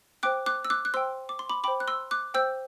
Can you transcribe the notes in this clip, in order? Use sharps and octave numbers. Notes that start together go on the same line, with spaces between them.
C5 G5 D6 F#6
D6 F#6
E6
D6 F#6
F#6
C5 G5 C6 E6
D6
C6
B5 D6
C5 G5 B5 D6
F#6
C6 E6
D6 F#6
C5 G5 E6 G6